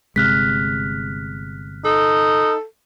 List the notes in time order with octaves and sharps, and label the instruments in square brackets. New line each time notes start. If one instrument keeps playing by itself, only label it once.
[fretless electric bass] G1 C3 G#3 [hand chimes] F6 F#6 B6
[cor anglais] D#4 [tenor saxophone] A4